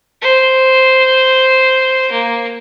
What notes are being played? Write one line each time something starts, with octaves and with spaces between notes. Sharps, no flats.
C5
A#3